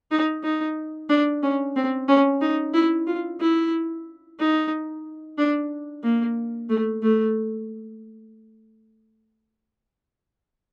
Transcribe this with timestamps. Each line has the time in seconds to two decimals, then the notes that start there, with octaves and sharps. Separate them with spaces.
0.11 D#4
0.44 D#4
1.10 D4
1.42 C#4
1.76 C4
2.08 C#4
2.41 D#4
2.74 E4
3.07 F4
3.40 E4
4.40 D#4
5.38 D4
6.04 A#3
6.69 A3
7.03 A3